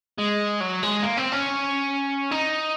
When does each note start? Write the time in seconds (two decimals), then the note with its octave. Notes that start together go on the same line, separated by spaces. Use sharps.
0.18 G#3
0.61 F#3
0.83 G#3
1.03 A#3
1.18 C4
1.32 C#4
2.31 D#4